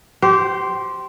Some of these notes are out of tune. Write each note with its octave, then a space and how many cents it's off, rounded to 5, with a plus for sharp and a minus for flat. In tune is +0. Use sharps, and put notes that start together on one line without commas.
G4 -25 C5 +0